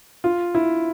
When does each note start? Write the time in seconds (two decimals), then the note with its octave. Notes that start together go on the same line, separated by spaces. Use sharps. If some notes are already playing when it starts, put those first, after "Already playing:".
0.24 F4
0.55 E4